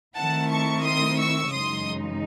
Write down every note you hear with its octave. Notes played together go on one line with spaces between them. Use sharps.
D#3 A3 C4 E4 F#5 A5
A5 C#6
C6 D#6
C#6 E6
F#2 C#3 E3 G#3 D#4 C6 D#6